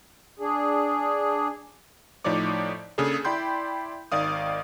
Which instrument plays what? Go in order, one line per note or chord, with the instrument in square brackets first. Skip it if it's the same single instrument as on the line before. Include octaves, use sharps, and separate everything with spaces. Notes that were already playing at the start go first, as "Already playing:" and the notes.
[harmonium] D4 G#4
[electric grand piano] A2 F3 D#4 C#5 D5 D6
C#3 A#3 D4 G#4 A4 C#5
E4 D5 G5 B5 C6 G6
G#1 D#3 D5 F5 D#6